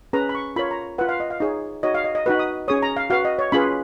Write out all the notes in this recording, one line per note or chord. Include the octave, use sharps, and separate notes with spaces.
C#4 G#4 B4 A#5
B5
C#6
F4 A#4 C#5 B5
A#5
F4 B4 F#5
F5
D#5
F5
D#4 G#4 C#5
D#4 F#4 C#5 D#5
F5
D#5
D#5
D#4 F#4 B4
D#6
C#4 G#4 C#5 D#6
A#5
F5
F#4 B4 F5
D#5
C#5
C#4 F4 G#4 B4 B5